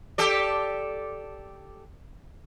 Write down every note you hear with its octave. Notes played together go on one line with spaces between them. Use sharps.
G4 A4 D5